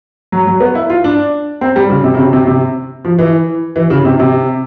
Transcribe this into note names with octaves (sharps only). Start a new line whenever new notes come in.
F#3
F#3
B3
E4
F4
D4
C4
G3
C#3
C3
C#3
C3
C3
C3
F3
E3
E3
C#3
C3
C3